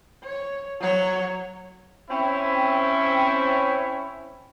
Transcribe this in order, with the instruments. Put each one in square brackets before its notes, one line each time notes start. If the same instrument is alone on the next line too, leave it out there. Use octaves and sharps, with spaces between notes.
[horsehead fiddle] C#5
F#3 C#5
[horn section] C4 C#4 E4